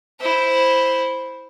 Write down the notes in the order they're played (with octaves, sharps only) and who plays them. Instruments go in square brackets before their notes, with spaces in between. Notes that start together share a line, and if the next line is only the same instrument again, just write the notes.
[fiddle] E4 C5